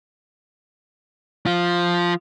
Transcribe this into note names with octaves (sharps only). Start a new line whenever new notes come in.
F3 F4